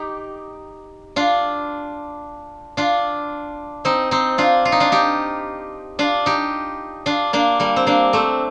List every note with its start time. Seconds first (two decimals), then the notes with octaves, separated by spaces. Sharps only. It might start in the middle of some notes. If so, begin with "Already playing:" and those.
Already playing: D#4 G4
1.16 D4 F4
2.77 D4 F4
3.85 C4 D#4
4.11 C4 D#4
4.38 D4 F4
4.65 F4
4.72 D#4
4.80 D4 F4
4.92 D#4 G4
5.99 D4 F4
6.26 D#4 G4
7.06 D4 F4
7.33 A#3 D4
7.60 G3 A#3
7.76 C4
7.87 A#3 D4
8.13 A3 C4